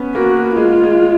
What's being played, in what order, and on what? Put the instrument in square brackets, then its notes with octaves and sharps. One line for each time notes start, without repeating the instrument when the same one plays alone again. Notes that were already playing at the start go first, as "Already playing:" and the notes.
Already playing: [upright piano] B3 C#4
[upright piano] A#3 [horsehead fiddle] F#4
[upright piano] G#3 [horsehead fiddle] F4
[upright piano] G#3